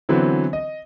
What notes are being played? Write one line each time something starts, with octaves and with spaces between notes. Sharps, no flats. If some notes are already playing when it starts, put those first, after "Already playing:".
D3 E3 F#3 B3 C4
D#5